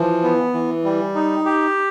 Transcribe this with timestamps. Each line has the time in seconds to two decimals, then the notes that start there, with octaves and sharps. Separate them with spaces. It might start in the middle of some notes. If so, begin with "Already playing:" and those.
Already playing: E3 F3
0.23 B3
0.53 E3
0.84 G3
1.15 D#4
1.46 G4